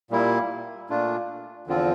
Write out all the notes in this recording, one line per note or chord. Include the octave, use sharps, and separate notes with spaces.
A#2 G3 A#3 E4
A#2 A3 D4 F4
E2 D3 F3 C4 F4